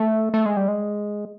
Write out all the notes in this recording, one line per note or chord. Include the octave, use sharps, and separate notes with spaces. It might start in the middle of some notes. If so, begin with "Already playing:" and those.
Already playing: A3
A3
G#3
G3
G#3